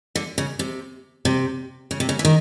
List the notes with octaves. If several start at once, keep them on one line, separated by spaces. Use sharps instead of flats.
D3
C#3
C3
C3
C#3
C3
C#3
E3
D#3